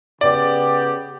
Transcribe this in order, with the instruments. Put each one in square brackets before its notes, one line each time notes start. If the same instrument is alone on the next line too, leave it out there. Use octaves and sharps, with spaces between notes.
[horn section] C#3 B3 G4 [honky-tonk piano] D5